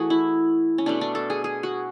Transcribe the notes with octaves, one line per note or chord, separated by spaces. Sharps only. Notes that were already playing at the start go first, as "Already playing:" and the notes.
Already playing: E3 A3 F#4 G#4
E4
C#4
B2 A3 D4
D4
A4
G#4
G#4
F#4